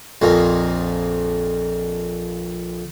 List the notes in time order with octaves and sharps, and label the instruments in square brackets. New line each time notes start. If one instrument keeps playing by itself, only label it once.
[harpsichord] A#1 F2 A#3